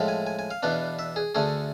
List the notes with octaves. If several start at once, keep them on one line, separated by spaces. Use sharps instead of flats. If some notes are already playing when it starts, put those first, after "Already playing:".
Already playing: A2 F3 G#3 C4
G#5
G#5
G#5
F5
E2 B2 B3 D4
E5
G#4
D2 D3 A3 G#4